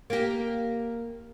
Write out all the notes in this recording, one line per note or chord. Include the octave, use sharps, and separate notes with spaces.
A#3 G4